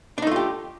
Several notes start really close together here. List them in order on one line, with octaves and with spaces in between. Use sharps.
D4 D#4 A3 F4 G4